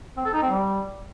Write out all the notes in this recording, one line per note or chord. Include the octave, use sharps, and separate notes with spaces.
C4
A4
D#4
C4
G3